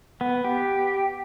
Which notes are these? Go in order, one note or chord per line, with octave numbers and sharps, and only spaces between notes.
B3
G4